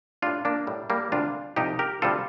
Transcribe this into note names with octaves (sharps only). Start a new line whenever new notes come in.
A2 G3 D4 F4
A#3 D4
A2 G3
G3 A#3
D2 C3 G3 D4 F4
C2 C3 F3 D#4 G4
G4 A#4
D2 C3 G3 F4 A4